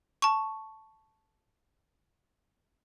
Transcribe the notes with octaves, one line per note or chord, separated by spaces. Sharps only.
A5 C#6